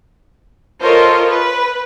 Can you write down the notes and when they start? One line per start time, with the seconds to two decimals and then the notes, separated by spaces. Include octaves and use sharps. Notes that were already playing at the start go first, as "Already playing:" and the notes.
0.82 F4 A4 A#4 C5 C#5 D#5
1.31 B4